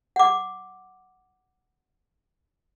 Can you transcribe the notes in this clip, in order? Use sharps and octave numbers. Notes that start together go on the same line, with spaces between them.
F#5 D6